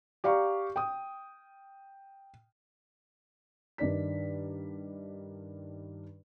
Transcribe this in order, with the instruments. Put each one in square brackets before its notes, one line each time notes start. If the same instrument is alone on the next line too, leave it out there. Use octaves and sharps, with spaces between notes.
[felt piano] G4 D5 F5 A#5 C#6
G5 D#6
G2 D#3 D4 D5 B6